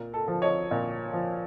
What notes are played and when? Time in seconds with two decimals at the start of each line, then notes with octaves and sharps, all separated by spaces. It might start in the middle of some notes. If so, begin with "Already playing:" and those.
Already playing: A#2 A#4
0.14 A4
0.28 F3
0.42 C#5 D#5
0.71 A#2
1.13 F3